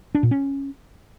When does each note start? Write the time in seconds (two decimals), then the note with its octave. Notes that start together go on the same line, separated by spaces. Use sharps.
0.15 D4
0.23 A#2
0.31 C#4